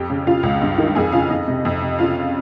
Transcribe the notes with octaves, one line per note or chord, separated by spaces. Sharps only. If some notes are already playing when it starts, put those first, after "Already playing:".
Already playing: F2 G4 G5
C#3
C#3 F4 F5
C#2
G2
D#3
F2 G#4 G#5
C#3 F4 F5
F2 D#4 D#5
C3
F2
C3
C#3 F4 F5